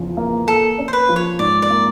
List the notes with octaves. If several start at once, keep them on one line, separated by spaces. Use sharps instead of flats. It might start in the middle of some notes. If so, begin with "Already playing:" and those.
Already playing: E2 C#3 F3
A#3
A#3 A4
C#4
C5
B4
F3
C#5
G#2 D5
D5
A#3